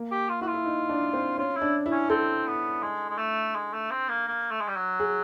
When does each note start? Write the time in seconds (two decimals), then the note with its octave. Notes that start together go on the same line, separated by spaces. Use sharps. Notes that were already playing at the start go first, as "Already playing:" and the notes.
Already playing: A#3
0.11 G4
0.29 F4
0.41 E4 F#4
0.47 F4
0.54 E4
0.66 D#4
0.89 D4
1.13 C4
1.38 C#4 F4
1.56 E4
1.62 D4
1.86 E4
1.92 C#4
2.10 C4 A4
2.47 B3
2.83 G#3
3.10 G#3
3.18 A3
3.55 G#3
3.73 A3
3.91 C4
4.09 A#3
4.27 A#3
4.51 A3
4.61 G#3
4.68 G3
4.76 F#3
5.00 G#4